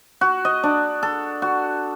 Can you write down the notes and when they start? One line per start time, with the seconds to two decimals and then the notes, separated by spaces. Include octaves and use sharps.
0.21 F#4
0.45 D#5
0.63 D4
1.03 A4
1.42 F#4